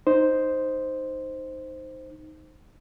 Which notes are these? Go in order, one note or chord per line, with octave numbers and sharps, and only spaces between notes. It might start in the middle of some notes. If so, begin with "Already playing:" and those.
D#4 C5